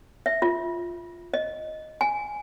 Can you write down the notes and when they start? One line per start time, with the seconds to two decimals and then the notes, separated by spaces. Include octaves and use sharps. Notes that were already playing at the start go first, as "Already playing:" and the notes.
0.26 E5
0.42 F4
1.34 D#5
2.01 G#5